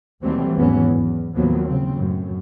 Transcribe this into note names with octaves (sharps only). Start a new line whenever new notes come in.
D#2 E3 F#3 G3 A3 C4
G#1 E2 E3 F#3 B3 C#4
E2
D#2 A2 F3 F#3 A#3 B3
C#3 C4
F#2 A2